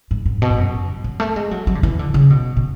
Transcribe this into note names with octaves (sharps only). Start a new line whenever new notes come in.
G#2
G#2
B2
G#2
F#2
G#2
F#3
F#3
A3
G#3
F#3
F#3
D3
E3
D3
C#3
B2
B2